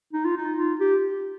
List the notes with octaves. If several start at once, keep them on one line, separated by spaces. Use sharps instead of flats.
D#4
F4
D#4
F4
G4